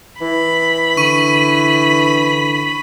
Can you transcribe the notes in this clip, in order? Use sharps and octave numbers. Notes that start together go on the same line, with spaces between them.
E3 B5
D3 C#6 D#7